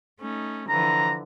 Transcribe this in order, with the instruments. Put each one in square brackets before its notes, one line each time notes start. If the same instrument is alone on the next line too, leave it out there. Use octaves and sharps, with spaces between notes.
[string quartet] A3 C#4 D#4
[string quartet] D3 E3 F3 [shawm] A#5